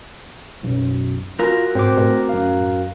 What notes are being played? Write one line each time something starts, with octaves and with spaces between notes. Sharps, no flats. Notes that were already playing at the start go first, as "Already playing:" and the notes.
B1 F#2
F4 F#4 A#4
G#2 C4 C5 D6
A2
F#2 F5